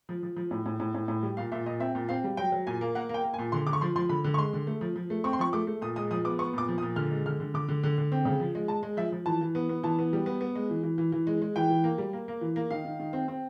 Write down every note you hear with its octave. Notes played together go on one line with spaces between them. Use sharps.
F3
F3
F3
A2
A2
A2
A2
A2
G3
A#2 F5
A#2 E5
A#2 D#5
C4 E5
A#2
C4 F5
G3
F#3 G5
F#3
A#2 G#5
A#3
A#3 F#5
A#3 G5
A#3
G#5
A#2
D3 C6
D3 D6
C#6
F3 C6
F3 C6
D3 B5
D3
C#6
G#3 C6
D3
A3
F3
F3
A3
C4 C#6
C6
F3 C#6
A3 D6
A3
A#2 D#6
G#3 D#6
F3 D#6
B3 D6
B3 C#6
A#2 D6
F3
D#6
A#2
D3 F6
G#3
D3 F6
D3
D3 D6
D3
D3
D3
C4
C#3
F3
G#3
G#3 A5
G#3
F3 E5
F3
E3 A5
E3
B3
B3
E3 A5
B3
G3
B3
B3
G#3
E3
E3
E3
E3
G#3
G#3
E3 G5
E3
A#3
G3
A#3
A#3
E3
A#3
D#3 F5
D#3
D#3
C4
C4